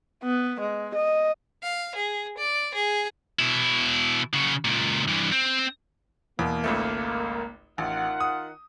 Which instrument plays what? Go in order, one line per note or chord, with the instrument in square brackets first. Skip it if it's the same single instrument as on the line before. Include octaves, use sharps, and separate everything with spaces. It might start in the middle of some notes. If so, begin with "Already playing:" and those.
[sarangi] B3
G#3
D#5
[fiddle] F5
G#4
D5
G#4
[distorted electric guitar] B2 E4
C#3 F#4
C#2 A#2
G2 E3
C4
[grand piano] E2 B2 [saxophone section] A#3
[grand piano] G#1 C#2 A3
[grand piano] A1 [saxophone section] D#3 F4 F#5
[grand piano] D#6